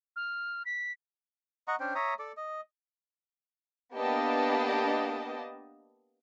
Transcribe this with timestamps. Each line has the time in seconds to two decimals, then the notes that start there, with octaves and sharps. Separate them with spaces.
0.16 F6
0.66 B6
1.68 D#5 F#5 A#5 C#6
1.80 C#4 D4 C5 G5
1.95 C#5 E5 A#5 D#6
2.19 A4 D5 D6
2.37 D#5
3.95 A#3 B3 D4 G4 D#5 A5